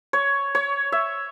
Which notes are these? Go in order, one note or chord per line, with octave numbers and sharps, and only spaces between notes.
C#5
C#5
E5